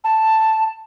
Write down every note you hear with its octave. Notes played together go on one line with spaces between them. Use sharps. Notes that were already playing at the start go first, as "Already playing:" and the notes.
A5